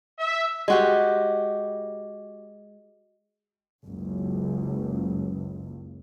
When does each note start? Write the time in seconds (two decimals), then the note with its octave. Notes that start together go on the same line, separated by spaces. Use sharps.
0.19 E5
0.68 G#3 F#4 G4
3.84 F#1 C#2